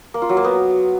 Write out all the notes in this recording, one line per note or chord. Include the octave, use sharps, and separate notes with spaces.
A#3
F4
F#3
A#3
B3